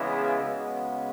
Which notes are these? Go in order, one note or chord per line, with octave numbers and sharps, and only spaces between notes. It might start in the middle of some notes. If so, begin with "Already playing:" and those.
Already playing: C#3 E3 G#3 B3
C#3 G#3 B3 F#4